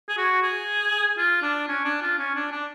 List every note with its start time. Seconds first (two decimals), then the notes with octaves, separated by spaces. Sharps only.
0.08 G#4
0.17 F#4
0.42 G#4
1.17 F4
1.42 D4
1.68 C#4
1.84 D4
2.01 F4
2.18 C#4
2.34 D4
2.51 D4